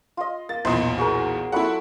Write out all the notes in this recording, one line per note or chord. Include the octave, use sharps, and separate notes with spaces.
F4 D#5
A#3 A6
B1 E2 A#2 C5 D#5 B5
F#4 G#4 A#4
F#3 A3 E4 F#5 B5